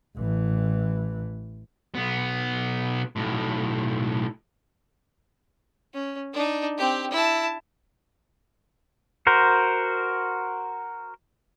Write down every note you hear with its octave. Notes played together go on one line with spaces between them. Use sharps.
A1 E3
B1 B3
B1 A2
C#4
D4 D#4
C4 G4
E4 A5
F#4 A#4 C5